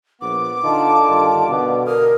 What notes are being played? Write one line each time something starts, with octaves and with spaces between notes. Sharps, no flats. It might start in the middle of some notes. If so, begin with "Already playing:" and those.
A#1 B3 D6
D3 D#4 F4 A5
G2 D#3 F4
B2 D3 B3
A#4 D#6 F6